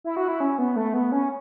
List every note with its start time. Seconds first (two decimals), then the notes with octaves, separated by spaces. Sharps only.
0.04 E4
0.17 F#4
0.28 E4
0.40 C#4
0.58 B3
0.76 A3
0.94 B3
1.12 C#4